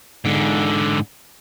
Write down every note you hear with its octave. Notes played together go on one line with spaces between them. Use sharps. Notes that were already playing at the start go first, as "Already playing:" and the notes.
G#2 D3